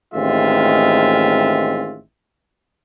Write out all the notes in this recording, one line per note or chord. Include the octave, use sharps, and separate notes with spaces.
A1 D#3 G#3 C4 F4 E5